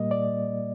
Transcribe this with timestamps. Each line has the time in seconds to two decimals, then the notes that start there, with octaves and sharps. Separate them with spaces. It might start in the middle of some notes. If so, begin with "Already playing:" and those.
Already playing: A#2 G3 A#3 D#5
0.11 D5